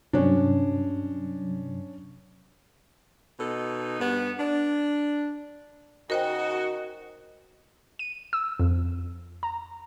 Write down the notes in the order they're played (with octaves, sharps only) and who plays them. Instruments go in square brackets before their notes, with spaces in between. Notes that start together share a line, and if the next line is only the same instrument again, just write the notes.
[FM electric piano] G2 C3 F#3 [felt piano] C#4 D4
[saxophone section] B2 D#4 A4
G2 B3
D4
[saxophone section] C#3 D#4 F#4 [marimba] A#4 C5 G5 [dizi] D#5
[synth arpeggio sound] D#7
E6
F2
A#5